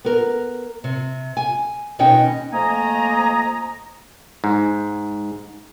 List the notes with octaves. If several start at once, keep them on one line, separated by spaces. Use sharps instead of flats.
B3 A#4
C3
G#5
D#2 B2 C#4 D#4 D#5 G5
F2 A3 A#3 D#5 G#5 A#5
G#2